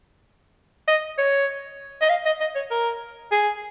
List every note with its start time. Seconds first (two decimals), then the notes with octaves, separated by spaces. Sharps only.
0.88 D#5
1.18 C#5
2.01 D#5
2.09 F5
2.25 D#5
2.40 D#5
2.55 C#5
2.71 A#4
3.31 G#4